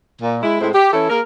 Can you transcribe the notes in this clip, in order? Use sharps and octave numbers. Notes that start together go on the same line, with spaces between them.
A#2
G#3 E4
A2 G#3 C4 E4
G4
E3 C#4 E4 A4
A#3 G#4 A#4